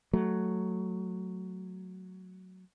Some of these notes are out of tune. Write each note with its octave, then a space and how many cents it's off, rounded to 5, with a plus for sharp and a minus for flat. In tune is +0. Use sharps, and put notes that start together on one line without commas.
F#3 +0 A3 +0